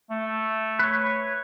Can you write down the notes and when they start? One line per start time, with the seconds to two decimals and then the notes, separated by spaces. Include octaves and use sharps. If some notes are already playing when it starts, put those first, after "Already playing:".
0.10 A3
0.79 B4 C#5